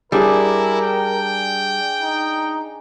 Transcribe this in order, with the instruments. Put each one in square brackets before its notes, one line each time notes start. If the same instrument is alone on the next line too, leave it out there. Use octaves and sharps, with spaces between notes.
[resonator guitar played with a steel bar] G3 [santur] D4 G#4 [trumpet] E4 [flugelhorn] A#4
[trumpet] G5
[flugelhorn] D#4